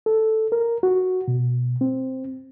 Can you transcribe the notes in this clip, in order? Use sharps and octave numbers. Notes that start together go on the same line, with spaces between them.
A4
A#4
F#4
B2
C4